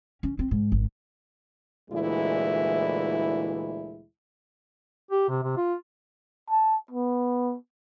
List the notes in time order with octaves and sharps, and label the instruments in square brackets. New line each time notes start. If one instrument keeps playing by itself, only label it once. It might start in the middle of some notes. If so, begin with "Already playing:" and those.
[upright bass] C#4
C4
G#2
G#1
[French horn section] D2 A#2 E3 G#3 E4
[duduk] G4
C3
C3
F4
[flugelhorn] A5
B3